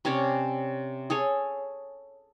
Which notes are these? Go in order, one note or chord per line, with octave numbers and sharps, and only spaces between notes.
C3 C#4 C#5 D5
G#4 A4 C#5 G#5